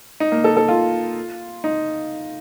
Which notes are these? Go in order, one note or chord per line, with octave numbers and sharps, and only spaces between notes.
D#4
A#3
A4
A4
F4
D#4